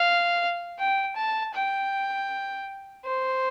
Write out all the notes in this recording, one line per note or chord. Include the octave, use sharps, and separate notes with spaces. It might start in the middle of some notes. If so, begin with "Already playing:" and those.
Already playing: F5
G5
A5
G5
C5